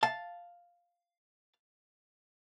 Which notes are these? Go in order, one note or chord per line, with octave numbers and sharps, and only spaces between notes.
F5 A5